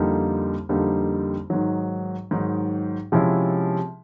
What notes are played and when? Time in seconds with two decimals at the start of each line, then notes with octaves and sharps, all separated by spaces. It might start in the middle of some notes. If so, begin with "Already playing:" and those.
Already playing: F2 D3 G3 A#3 D#4
0.69 F2 D3 G3 A#3 D#4
1.50 G#2 D#3 F#3
2.31 G#2 D#3 F#3
3.12 C3 F3 G#3 C#4 E4